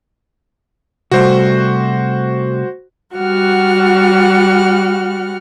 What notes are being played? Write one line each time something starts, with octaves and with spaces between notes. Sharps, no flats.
C3 G3 A3 F#4 C5
G3 F#4 F#5 F6